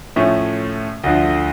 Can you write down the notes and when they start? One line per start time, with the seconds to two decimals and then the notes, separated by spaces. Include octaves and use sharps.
0.16 A2 F3 A3 C#4
1.04 D2 D3 F3